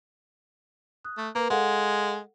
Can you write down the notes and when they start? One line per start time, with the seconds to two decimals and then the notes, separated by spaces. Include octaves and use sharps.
1.05 D#6 F#6
1.18 A3
1.35 A#3 A#4 B4
1.50 G#3 A4 F5 F#5